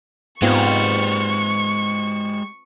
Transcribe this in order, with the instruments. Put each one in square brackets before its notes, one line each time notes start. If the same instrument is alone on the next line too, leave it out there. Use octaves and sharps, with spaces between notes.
[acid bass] G#2 [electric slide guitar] G#3 G4 [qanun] B3 C4 F4 [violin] C#6